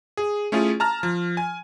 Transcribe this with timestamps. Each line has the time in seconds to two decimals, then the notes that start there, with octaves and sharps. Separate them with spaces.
0.17 G#4
0.52 A3 C#4 E4 F4 G#4
0.80 A5 A#5 F6
1.03 F3
1.37 G#5